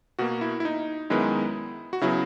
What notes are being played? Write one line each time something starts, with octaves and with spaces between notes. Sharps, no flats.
B2 A#3 F#4
E4
E4
D#4
F#2 D#3 G#3 B3 E4
F#4
C#3 F#3 B3 E4